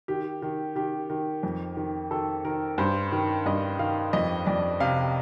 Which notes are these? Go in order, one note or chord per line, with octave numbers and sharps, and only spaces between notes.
D#3 G4
D#3
D#3 G4
D#3
F2
D#3
D#3 A4
D#3 A#4
G2 C5
D#3
G2 D#5
D#3 F5
F2 D#5
F2 D5
C3 F5